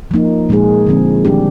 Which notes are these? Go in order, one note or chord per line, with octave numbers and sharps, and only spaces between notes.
F3 A#3 D#4
A#2 G#3 D#4 G#4
D3 F3 C4
D#3 G3 D4 G4